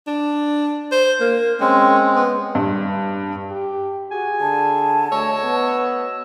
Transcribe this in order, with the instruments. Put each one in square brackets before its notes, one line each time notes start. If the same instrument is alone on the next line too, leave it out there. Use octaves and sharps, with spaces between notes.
[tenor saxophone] D4
C5
A#3
[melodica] G#3 C4 [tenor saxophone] C#4
[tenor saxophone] B3
[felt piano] G2
[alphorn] G4
[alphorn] F#4 [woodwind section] G#4 G#5
[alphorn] D3 [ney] A5
[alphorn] A3 [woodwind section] F#4 D#5 E6 [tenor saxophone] C#5
[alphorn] B3